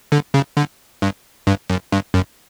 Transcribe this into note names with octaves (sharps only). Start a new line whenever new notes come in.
D3
C#3
D3
G2
G2
F#2
G2
F#2